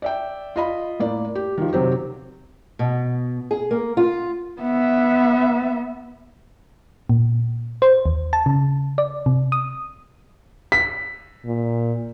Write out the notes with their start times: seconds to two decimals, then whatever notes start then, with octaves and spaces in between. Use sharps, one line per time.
0.02 D5 E5 G5
0.56 F4 D#5 B5
1.00 A2 A#3 D5
1.35 G4
1.58 D#3 F3
1.73 C3 D#3 F#3 C4 G4
2.79 B2
3.51 G#4
3.71 A#3
3.97 F4
4.61 B3 E5
7.10 A#2
7.82 C5
8.06 D#2
8.33 A5
8.46 C#3
8.98 D5
9.26 C3
9.52 D#6
10.72 B6
11.46 A#2